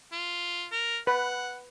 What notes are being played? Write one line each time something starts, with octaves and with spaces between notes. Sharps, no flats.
F4
A#4
B4 F#5